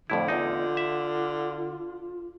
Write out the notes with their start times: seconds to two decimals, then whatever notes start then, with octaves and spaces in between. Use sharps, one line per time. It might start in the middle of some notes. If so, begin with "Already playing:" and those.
0.10 F2 A2 D3 E4
0.28 E2 D#4 F4
0.77 E5